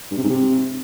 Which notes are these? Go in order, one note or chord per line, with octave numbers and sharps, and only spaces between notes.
G2
C3
G#2
C3